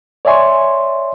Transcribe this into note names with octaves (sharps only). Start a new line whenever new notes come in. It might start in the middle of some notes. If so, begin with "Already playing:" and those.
C#5 D5 E5 G#5 C6 C#6